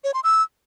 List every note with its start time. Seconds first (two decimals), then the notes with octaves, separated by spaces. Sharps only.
0.04 C#5
0.14 C6
0.24 E6